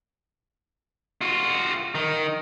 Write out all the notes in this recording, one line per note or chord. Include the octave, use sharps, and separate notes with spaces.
F4 F#4
D#3